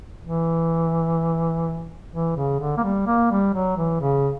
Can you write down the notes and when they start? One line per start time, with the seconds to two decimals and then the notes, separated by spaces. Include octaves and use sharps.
0.23 E3
2.12 E3
2.36 C#3
2.60 D3
2.77 A#3
2.84 G3
3.07 A#3
3.31 G3
3.54 F#3
3.77 E3
4.01 C#3